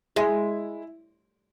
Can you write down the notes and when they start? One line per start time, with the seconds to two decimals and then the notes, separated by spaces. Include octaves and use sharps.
0.16 G#3 E4